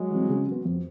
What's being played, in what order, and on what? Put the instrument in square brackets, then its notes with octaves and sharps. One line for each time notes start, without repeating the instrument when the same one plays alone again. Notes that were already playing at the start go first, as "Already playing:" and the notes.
Already playing: [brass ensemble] F#3 G#3
[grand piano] E3 G3 C4
C#3
F#3
B3
F2